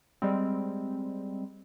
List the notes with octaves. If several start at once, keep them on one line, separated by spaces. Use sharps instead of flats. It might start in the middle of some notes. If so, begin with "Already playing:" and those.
G3 G#3 C4